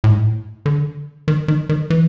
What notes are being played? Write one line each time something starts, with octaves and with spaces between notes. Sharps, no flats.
A2
G#2
A2
D3
D#3
D#3
D#3
E3